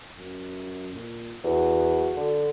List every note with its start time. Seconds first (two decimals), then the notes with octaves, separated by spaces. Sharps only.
0.17 F#2
0.94 A#2
1.44 E2 F#4
2.17 D3